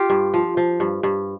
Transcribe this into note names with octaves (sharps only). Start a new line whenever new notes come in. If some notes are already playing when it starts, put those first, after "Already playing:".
Already playing: F4 G4
G2
F3
F3
G2
G2